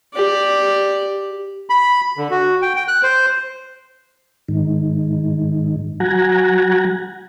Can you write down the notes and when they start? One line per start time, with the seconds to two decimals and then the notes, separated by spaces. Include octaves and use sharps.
0.14 G4 D5
1.70 B5
2.17 D3
2.31 F#4
2.62 G5
2.76 G5
2.88 F#6
3.03 C5
4.48 G#2 D#3
6.00 F#3 F#5 G#5 A#5